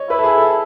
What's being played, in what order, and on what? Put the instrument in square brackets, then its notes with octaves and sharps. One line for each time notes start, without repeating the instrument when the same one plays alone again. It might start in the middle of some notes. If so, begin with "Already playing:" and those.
Already playing: [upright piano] C#5 D#5
[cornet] E4 [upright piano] B4
[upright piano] A4
G#4
A4